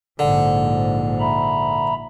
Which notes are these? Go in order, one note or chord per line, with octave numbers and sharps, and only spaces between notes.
A#1 G#2 D3
E5 A#5 B5